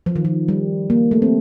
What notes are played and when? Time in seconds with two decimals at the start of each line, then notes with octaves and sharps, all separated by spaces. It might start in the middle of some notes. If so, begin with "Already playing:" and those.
0.06 F3
0.16 D#3
0.25 F3
0.48 G3
0.90 A#3
1.11 A3
1.22 C4